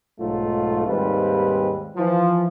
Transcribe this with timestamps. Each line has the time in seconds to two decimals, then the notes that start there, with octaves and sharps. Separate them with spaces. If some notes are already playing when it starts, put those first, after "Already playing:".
0.19 B1 G#2 F#3 A3 F4
0.87 D#2 G#2 G3 C4 B4
1.97 E3 F3